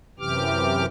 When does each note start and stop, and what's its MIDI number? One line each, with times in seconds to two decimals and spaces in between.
0.19 0.86 42
0.19 0.86 48
0.19 0.86 52
0.19 0.86 67
0.19 0.86 86
0.19 0.86 89